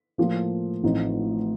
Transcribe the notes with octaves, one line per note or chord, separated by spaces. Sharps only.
A2 F3 A#3
A1 A2 F3 C4 D#4